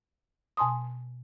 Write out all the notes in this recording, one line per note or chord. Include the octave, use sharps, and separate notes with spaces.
B2 G#5 A5 C6 D#6